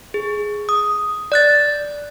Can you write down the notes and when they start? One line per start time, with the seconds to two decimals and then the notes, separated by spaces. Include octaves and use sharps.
0.14 G#4
0.69 D#6
1.32 D5 F#6 A6